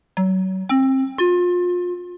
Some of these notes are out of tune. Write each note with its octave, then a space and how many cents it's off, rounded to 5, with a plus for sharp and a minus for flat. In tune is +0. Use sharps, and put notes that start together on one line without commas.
F#3 +30
C4 +25
F4 +30